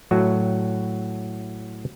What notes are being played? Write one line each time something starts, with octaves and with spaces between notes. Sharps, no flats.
A2 F#3 A3 F#4